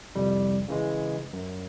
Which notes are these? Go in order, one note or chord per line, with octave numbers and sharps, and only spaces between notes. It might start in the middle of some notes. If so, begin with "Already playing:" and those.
C2 F2 G3
C#3 E3 G#3
F#2